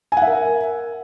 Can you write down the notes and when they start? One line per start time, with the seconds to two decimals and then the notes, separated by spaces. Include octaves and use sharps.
0.12 G#5
0.17 F#5
0.22 E5
0.27 A#4